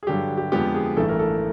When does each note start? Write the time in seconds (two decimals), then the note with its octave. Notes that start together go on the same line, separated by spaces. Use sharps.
0.03 G#4
0.07 G2 D3 F#3 G4
0.37 G4
0.52 F2 D3 F3 G#3 B3 G4
0.74 G#4
0.97 A1 G2 E3 A3 A4
1.08 A#4
1.19 A4